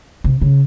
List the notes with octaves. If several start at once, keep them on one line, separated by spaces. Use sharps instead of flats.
C3
C#3